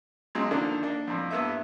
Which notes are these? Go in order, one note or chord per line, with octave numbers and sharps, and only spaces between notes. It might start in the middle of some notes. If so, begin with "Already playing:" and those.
B1 F#3 G#3
D3 D#3 F3 A#3 D4
A#3 D4
F2 A2
G2 A#3 B3 E4 E5